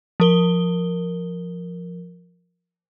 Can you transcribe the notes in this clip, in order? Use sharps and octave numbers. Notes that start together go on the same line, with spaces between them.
F3 A#4 G7